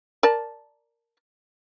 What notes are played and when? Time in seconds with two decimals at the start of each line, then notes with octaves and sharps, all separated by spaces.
0.23 A#4 D5 A5